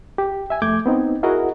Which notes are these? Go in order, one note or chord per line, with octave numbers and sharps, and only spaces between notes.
G4
E5 G#5
F2 A3 D6 G6 G#6
B3 C4 D#4
E4 F#4 G#4 A#4 D#5 F#5